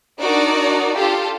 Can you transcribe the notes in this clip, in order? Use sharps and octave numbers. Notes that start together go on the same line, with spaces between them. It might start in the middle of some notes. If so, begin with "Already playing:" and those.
D4 D#4 F#4 A#4 D5
F4 G4 A4